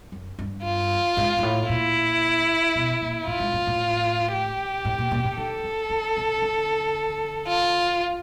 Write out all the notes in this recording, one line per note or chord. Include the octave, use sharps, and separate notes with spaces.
F#2
G2
F4
G#2
G#2
A2
A#2 E4
B2
A#2
A2 F4
G#2
A2
A2
G4
A2
A#2
A#2
A2
D#3 A4
D#3
D#3
C#3
D3
F4